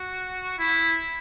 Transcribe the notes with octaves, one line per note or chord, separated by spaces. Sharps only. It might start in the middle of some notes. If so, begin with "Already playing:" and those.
Already playing: F#4
E4